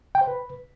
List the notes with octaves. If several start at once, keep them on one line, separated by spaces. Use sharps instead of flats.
G5
C5
B4